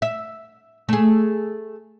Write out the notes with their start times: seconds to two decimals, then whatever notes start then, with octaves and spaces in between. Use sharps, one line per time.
0.02 E5
0.89 A3 G#4